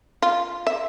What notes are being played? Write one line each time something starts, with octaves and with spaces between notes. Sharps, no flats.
F4
E5